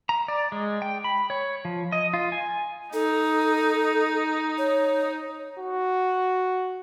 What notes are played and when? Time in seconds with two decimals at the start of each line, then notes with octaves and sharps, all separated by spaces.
0.09 A#5
0.28 D5
0.52 G#3
0.82 G5
1.04 B5
1.30 C#5
1.65 F3
1.92 D#5
2.14 F4
2.32 G#5
2.93 D#4 A4
4.58 C#5
5.60 F#4